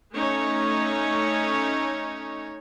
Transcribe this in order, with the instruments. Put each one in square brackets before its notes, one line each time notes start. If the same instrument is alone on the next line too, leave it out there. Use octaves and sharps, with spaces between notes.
[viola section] A3 C#4 D#4 C#5